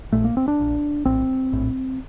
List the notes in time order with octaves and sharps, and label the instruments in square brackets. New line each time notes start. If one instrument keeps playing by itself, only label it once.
[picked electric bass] A#1 A#2 A3
A#3
C4
D4
A#1 A#2
A#1 A2 C4
A#1 A2